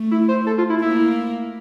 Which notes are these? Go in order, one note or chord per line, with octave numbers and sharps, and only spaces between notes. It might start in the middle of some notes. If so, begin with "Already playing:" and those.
Already playing: A3
E4
C5
A4
F4
E4
A#3 E4